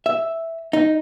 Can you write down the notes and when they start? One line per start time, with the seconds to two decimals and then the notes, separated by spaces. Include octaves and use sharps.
0.06 E5
0.73 D#4